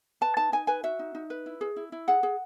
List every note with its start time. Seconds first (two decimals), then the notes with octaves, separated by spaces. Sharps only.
0.21 B4 A5
0.37 D#4 A5
0.52 D#4 G#5
0.67 B4 G#5
0.83 F#4 E5
0.99 D#4
1.15 D#4
1.30 B4
1.46 E4
1.61 G#4
1.76 E4
1.92 E4
2.08 G#4 F#5
2.23 G#4